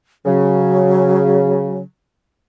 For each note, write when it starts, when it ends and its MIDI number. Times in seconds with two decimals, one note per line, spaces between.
0.25 1.79 49
0.25 1.82 54